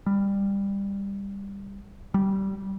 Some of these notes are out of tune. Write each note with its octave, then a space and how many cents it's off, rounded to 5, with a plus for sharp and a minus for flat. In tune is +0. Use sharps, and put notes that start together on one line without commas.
G3 +15
G3 -20